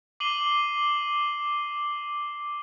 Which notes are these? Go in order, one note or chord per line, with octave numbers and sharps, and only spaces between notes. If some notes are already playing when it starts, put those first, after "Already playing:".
D6 C7 D#7 F#7 G7